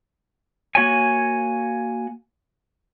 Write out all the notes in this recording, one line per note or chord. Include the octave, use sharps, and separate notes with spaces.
A#3 F#4 C#5 G#5